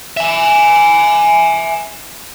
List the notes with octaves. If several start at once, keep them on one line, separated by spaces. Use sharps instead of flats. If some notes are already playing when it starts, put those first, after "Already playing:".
E5 G#5